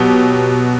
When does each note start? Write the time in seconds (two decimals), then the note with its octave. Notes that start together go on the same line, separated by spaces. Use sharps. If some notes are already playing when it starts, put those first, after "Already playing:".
Already playing: B2 F#3 G4